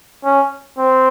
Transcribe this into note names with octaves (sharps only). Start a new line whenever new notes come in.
C#4
C4